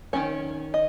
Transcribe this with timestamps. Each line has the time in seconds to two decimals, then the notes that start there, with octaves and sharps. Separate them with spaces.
0.13 D#3 A3 C#4 C#5
0.74 D#5